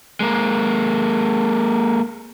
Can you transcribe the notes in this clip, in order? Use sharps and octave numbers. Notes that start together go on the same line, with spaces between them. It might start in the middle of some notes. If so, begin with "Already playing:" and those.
G#3 A#3